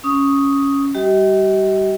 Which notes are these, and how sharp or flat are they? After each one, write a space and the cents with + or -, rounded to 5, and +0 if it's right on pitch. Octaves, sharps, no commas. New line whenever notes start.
C#4 +0 D#6 +5
G3 +0 G4 -40 D#5 +40